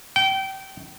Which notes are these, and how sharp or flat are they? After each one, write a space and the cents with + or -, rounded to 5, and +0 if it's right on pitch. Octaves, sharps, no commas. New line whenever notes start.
G5 -25